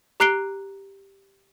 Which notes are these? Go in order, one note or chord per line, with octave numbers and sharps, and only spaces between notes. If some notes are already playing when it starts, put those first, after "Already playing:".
G4 A#5 F#6 C7 D7 G7